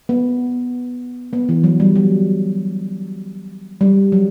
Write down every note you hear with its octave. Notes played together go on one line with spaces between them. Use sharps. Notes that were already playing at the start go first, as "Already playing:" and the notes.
B3
B3
E3
F#3
G3
F#3
G3
F#3